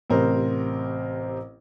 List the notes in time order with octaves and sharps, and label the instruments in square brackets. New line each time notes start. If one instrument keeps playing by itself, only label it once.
[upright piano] A1 C3 A#4 C5